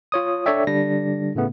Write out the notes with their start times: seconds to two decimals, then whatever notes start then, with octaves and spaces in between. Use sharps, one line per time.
0.12 F4 C#5 D#6
0.46 D4 A4 C#5 D5 E5 G5
0.67 D3 G3 D4 A#6
1.35 A2 C#3 A3 B3